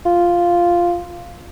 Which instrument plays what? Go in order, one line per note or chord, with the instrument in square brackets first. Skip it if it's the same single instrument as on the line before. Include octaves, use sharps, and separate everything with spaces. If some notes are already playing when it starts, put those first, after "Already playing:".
[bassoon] F4